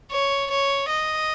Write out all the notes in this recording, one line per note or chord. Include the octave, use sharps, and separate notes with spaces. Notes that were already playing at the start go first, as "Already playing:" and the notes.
C#5
C#5
D#5